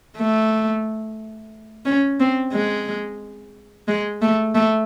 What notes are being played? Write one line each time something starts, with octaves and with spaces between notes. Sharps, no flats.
A3
C#4
C4
G#3
G#3
A3
A3